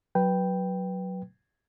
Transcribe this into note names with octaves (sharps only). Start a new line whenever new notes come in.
F#3 B4 G5